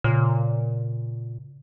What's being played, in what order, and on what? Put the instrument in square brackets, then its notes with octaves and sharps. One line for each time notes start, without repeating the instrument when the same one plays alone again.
[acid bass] A#2 [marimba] C#3